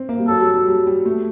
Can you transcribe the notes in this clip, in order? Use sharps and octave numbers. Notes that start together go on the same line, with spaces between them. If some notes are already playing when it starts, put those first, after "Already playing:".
Already playing: C4
A#3
G3
F#3 A4
G3
F#3
G3
G3
A3